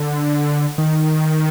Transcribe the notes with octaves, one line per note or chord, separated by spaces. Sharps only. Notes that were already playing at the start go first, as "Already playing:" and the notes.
Already playing: D3
D#3